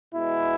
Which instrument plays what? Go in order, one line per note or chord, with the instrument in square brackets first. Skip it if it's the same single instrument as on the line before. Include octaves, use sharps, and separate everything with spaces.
[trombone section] B2 G#3 B3 E4